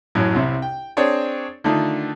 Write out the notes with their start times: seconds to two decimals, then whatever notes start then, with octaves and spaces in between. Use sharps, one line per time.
0.15 A1 F#2 A2 F#3
0.35 C2 C3 E4
0.62 G5
0.97 C4 D4 G#4 C#5 D5
1.64 D3 D#3 A3 D4 D#4 F4